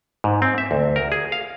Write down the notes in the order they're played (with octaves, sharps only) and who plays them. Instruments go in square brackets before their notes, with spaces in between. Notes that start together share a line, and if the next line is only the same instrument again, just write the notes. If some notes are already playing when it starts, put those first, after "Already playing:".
[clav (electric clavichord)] G#2
C4
E5
D2
A#4
G#4
F5